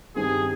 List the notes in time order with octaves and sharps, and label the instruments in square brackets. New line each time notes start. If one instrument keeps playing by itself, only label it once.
[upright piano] G2 D#3 G3 C4 [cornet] G#4